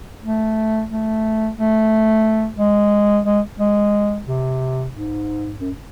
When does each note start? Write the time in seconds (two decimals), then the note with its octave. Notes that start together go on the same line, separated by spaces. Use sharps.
0.23 A3
0.90 A3
1.57 A3
2.59 G#3
3.25 G#3
3.59 G#3
4.27 C3
4.94 G#2
5.60 F#2